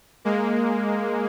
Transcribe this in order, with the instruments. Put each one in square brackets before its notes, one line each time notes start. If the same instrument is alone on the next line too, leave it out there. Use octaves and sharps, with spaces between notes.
[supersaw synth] G#3 A#3